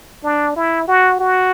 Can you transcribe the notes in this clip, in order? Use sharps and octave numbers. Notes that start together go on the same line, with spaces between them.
D4
E4
F#4
F#4